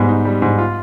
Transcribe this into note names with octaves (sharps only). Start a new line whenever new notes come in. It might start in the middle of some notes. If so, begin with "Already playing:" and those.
Already playing: G#2 G3 B3
D#4
G3
G#2
F4